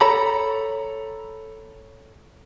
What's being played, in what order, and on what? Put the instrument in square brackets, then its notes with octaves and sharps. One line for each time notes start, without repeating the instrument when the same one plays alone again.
[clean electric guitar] A4 C#5 A#5 B5